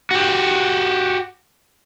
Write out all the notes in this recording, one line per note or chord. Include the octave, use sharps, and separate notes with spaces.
F#4 G4